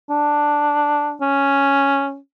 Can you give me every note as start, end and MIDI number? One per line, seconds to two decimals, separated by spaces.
0.10 1.16 62
1.21 2.18 61